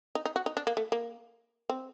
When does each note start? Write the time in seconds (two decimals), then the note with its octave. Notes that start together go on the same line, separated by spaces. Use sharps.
0.15 D#4
0.25 D#4
0.36 F#4
0.46 D#4
0.57 D4
0.67 A#3
0.77 A3
0.92 A#3
1.69 C4